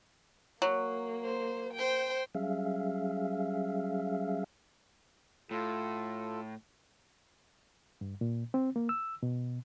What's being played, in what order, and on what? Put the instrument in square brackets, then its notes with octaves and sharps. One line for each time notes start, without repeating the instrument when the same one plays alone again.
[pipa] F#3 [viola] A#3
[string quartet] C5
C5 G5
[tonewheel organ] F#3 G3 C#4 G#4 E5 F5
[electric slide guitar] A2 [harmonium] F4 A4
[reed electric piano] G2
A#2
C4
A#3
E6
B2